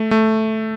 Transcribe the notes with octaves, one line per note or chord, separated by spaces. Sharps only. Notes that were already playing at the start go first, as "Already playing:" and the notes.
Already playing: A3
A3